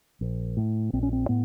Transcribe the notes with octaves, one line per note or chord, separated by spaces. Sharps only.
A#1
A2
A#1 C4
C#4
C4
A2 B3